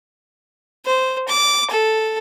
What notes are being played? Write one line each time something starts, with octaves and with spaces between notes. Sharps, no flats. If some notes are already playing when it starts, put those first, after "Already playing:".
C5
D6
A4